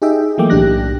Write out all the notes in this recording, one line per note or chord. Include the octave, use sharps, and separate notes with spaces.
D#4 G4 G#4 D#5 E5 G5
E3 F#3 A3 A#3 G5 D6
B1 A2 D4 G4 F#6 A#6